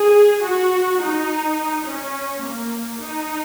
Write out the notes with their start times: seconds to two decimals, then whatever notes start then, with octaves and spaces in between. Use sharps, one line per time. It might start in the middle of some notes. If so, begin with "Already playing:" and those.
Already playing: G#4
0.45 F#4
1.01 D#4
1.86 C#4
2.42 A#3
3.00 D#4